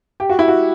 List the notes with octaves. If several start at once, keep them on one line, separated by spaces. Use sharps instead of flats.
G4
F#4
E4
F#4